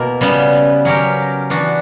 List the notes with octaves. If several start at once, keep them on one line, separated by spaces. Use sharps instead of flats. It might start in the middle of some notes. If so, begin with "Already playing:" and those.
Already playing: B2 A#3 E4 A#4
C#3 G3 B3
F#3 C#4 G4 A#4
E3 B3 D4 F#4